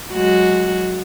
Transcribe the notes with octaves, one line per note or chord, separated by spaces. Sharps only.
F#3 G#3 F#4